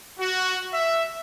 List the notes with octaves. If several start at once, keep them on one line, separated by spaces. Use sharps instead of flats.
F#4
E5